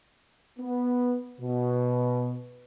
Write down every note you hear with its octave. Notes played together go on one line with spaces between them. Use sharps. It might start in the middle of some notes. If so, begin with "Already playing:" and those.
B3
B2